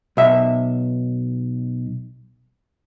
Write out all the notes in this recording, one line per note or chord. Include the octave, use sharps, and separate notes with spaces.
B1 E5